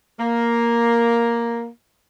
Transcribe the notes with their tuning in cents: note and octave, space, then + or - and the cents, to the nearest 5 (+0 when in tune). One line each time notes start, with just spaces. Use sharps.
A#3 +5